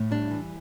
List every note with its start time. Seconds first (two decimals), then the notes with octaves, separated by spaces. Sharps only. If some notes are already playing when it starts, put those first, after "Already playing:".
Already playing: A2
0.11 G3 D4
0.31 E3